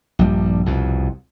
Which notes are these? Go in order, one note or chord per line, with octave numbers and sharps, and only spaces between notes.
A#1 G2 G3
C2 F2 B2